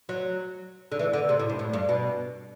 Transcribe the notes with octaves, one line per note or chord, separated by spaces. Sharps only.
F#3
D3
E3
D3
C3
A2
G2
A2
G2
B2